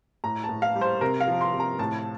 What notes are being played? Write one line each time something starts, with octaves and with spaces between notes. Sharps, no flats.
A2 A#5
A5
A2
F5
G3
C5
C3 A#4
F5
F3
C6
C3
A#5
A2 A5